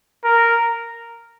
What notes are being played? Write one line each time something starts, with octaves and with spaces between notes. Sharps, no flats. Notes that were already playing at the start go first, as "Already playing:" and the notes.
A#4